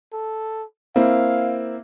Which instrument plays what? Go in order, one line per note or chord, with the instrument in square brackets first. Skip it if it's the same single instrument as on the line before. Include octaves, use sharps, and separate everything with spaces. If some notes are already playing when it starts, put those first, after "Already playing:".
[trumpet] A4
[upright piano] A#3 C4 E4 [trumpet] F5